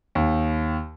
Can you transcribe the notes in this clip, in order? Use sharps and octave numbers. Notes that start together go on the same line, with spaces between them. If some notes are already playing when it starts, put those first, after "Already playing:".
D#2